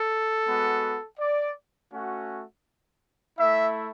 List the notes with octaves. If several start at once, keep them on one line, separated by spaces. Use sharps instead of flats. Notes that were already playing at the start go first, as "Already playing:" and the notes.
Already playing: A4
G#3 B3 F#4
D5
A3 C#4 F#4
A3 E4 E5